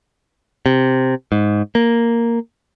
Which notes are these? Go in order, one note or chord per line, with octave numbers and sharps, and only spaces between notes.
C3
G#2
A#3